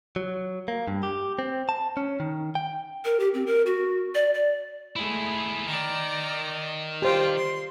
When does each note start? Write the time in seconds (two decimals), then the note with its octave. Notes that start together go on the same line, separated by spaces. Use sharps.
0.16 F#3
0.68 A#3
0.88 G2
1.03 G4
1.39 C4
1.69 A5
1.97 C#4
2.20 D#3
2.55 G5
3.05 A#4
3.20 G4
3.34 C4
3.47 A#4
3.66 F#4
4.15 D5
4.34 D5
4.96 G#3 A3 E4 G#4
5.67 D#3 D5 A#5
7.02 F4 G4 C5 G5
7.37 C6